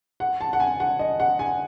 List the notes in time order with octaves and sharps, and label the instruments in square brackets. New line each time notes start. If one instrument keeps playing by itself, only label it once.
[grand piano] F#5
A5
F#5
G#5
F#5
D#5
F#5
G#5